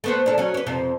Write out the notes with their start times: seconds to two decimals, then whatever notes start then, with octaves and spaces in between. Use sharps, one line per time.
0.04 A3 B3 C5
0.26 D4 A4
0.38 F#3 C#4
0.54 B4 C#5
0.67 F2 C3 F3